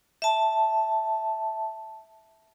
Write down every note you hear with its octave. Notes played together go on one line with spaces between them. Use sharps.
E5 A5